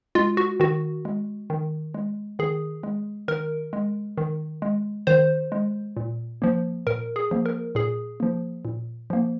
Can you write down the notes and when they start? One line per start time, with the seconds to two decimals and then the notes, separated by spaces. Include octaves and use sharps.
0.15 G#3 F4
0.37 F#4
0.60 D#3 F#4
1.05 G#3
1.50 D#3
1.94 G#3
2.39 D#3 G#4
2.83 G#3
3.28 D#3 A#4
3.73 G#3
4.18 D#3
4.62 G#3
5.07 D#3 C5
5.52 G#3
5.97 A#2
6.42 F3 A#3
6.87 A#2 A#4
7.16 G#4
7.31 F3 A#3
7.46 A#4
7.75 A#2 G#4
8.20 F3 A#3
8.65 A#2
9.10 F3 A#3